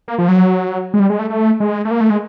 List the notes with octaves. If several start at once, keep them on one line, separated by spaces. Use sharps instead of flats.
A#3
F3
F#3
G#3
G3
G#3
A3
A3
G#3
A3
A#3
A3
G#3